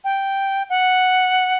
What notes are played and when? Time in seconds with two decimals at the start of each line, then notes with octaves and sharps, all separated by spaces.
0.04 G5
0.70 F#5